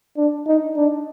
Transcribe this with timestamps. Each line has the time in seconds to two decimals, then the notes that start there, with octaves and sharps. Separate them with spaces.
0.17 D4
0.47 D#4
0.77 D4